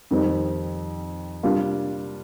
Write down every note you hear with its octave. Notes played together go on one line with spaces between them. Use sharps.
F2 D#3 G3 C4 D#4
C3 G3 A#3 D4 F4